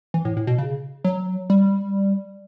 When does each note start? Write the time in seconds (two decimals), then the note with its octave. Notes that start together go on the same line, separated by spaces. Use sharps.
0.14 E3
0.25 A2
0.37 A2
0.47 B2
0.58 C#3
1.05 F#3
1.50 G3